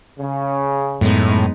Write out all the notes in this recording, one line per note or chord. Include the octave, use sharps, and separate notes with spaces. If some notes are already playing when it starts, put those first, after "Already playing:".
C#3
F#2 A2 G#3 B3 D#4